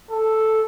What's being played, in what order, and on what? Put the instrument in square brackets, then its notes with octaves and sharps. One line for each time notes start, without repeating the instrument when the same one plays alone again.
[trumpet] A4